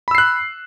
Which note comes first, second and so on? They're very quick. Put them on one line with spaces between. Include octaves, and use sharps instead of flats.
B5 E6 C7 F#6